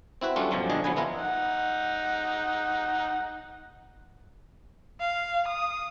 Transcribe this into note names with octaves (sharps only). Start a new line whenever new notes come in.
C4 E4 F#4 B4
F#3 G3 A3 C#4 D4 F4
G2 B2 F3 F#3 C#4
A#1 D3 G3 D4 D#5 G#5
F3 F#3 B3 B4 G#5
E3 B3 E4 F4 A#4
D#4 F#5
F5
D#6